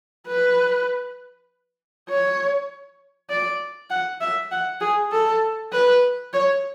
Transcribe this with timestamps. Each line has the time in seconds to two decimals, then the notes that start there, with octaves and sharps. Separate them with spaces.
0.27 B4
2.09 C#5
3.30 D5
3.90 F#5
4.21 E5
4.51 F#5
4.81 G#4
5.12 A4
5.72 B4
6.33 C#5